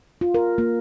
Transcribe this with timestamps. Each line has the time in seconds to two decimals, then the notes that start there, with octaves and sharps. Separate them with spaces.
0.21 F4
0.35 A#4
0.58 A#3